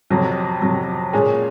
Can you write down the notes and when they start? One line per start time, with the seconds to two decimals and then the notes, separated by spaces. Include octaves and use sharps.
0.10 F2 C3 F#3
0.62 F2 C3 F#3
1.13 A#2 G#3 C#4 G#4